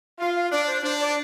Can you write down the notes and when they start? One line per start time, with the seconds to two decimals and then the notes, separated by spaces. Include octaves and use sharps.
0.18 F4 F5
0.35 F5
0.51 D4 D5
0.67 C5
0.83 D4 C5
1.00 D5